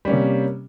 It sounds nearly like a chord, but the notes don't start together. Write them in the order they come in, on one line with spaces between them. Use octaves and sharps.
G3 C#4 A#3 C3